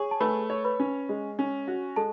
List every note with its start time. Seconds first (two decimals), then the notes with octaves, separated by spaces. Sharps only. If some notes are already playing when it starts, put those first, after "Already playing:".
Already playing: G#4 C#5 C#6
0.11 A5
0.20 A3 B4 B5
0.50 C#5
0.65 B4 B5
0.80 C#4
1.09 G#3
1.39 C#4
1.68 F#4
1.96 G#3 A4 A5